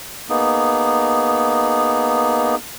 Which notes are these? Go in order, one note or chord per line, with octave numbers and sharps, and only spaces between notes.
A#3 B3 D#4 G#4